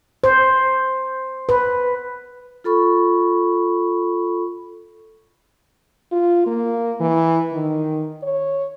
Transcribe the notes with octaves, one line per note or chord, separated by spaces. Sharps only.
C5
B4
F4 A4 B5 C#6
F4
A#3
E3
D#3
C#5